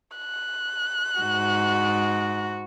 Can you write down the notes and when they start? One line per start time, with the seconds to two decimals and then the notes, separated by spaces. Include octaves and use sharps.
0.17 F#6
1.20 G#2 F#4